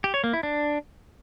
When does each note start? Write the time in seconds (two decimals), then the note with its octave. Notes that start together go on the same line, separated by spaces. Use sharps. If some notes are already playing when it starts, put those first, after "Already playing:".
0.04 G4
0.14 C#5
0.24 A#3
0.33 E4
0.43 D4